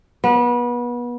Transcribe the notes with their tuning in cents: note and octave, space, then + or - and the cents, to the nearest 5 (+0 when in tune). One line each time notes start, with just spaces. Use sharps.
B3 -30